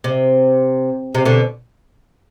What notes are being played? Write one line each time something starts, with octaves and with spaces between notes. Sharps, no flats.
C3
C3
B2 D3